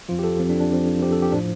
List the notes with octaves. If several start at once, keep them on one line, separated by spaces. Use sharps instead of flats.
F2 F3 F4
G4
A4
F2 F3 C4
D4
D4
F2 F3
F2 F3 G4
A4
G4
A2 F3 D4